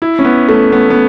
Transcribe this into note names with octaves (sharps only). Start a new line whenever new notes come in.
E4
C#4
B3
A3
B3
B3